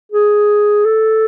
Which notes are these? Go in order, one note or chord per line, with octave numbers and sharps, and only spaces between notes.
G#4
A4